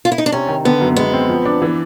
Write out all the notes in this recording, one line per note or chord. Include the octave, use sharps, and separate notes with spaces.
F4
E4
D#4
D4
C3 C#4
D#3
D3 B3
F#2
G#3 B3
C4
F3
D4
E3